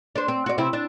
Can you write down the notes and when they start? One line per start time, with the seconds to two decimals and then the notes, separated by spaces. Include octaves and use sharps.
0.15 D4 C5
0.28 C4
0.46 F#4 D5
0.58 C3 C4 E4
0.73 D4